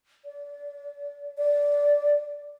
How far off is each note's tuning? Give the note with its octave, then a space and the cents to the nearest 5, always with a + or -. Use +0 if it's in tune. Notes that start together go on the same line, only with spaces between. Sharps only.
D5 -30
D5 -15